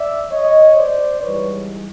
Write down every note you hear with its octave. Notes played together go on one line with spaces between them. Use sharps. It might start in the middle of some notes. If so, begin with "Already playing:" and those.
Already playing: D5 E5
C#5 D#5
C5 D5
G#2 E3 G3 B4 C#5